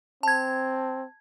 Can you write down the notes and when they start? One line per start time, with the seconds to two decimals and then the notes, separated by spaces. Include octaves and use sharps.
0.23 C4 A5 G#6